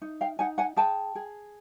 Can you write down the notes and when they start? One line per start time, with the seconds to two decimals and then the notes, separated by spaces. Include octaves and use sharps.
0.02 D#4
0.21 F5 G5
0.39 D#4 F#5 G#5
0.58 F#5 G#5
0.76 G#4 G5 A5
1.15 G#4